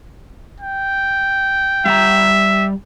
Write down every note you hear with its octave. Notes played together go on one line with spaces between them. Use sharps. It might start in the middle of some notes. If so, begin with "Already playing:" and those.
G5
G3 E5 F#5 A#5